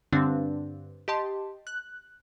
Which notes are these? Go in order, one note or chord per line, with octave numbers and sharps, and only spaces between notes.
G2 D3 C4 D4
G4 D#5 A5 C6
F#6